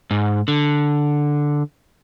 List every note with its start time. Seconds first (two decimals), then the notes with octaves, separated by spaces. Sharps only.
0.11 G#2
0.48 D3